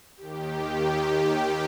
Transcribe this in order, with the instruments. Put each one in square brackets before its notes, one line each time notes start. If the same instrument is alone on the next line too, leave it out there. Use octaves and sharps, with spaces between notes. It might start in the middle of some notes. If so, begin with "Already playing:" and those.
[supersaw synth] D#2 D#3 G4